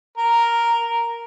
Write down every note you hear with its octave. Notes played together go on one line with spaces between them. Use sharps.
A#4